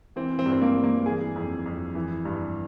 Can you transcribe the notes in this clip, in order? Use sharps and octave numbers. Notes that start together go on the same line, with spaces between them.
E3 C4
C4
G2
C4
A#3
G2
A#3
E3 G#4
F2
F2
E3
G2